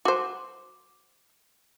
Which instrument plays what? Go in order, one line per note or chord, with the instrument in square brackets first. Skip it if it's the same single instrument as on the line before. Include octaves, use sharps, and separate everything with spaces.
[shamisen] F#4 C5 [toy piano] A5 D6